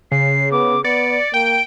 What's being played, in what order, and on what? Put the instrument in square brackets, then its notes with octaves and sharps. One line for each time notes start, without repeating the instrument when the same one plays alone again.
[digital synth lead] C#3 [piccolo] C7
[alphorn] B3 [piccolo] D6
[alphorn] B3 [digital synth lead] D5 [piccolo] C#7
[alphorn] A#3 [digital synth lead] G5 [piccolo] D7